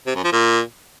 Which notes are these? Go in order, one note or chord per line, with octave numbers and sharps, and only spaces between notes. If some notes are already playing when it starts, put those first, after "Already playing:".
C3
F#2
F3
A#2